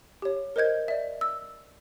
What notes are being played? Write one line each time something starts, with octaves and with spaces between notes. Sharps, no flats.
G4 C#5
A#4 C5 D#5 G6 G#6
D5 E5
E6